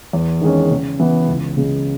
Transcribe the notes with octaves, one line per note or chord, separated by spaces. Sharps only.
E2
D#3 G#3 C#4
C#3
E3 B3
C#2
C#3 G#3